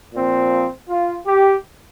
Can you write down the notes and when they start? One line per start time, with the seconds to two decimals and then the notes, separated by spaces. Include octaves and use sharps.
0.14 A#2 F3 C4
0.89 F4
1.26 G4